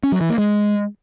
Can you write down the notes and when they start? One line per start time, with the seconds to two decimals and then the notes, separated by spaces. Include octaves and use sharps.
0.03 C#4
0.12 F#3
0.21 E3
0.29 A#3
0.38 G#3